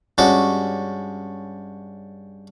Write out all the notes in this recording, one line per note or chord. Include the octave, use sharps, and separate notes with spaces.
G2 G#3 C#4 F#4 D6